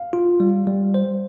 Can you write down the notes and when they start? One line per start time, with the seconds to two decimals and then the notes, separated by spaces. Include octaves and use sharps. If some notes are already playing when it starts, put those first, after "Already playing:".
Already playing: F5
0.13 F4
0.40 G3
0.67 G3
0.94 C5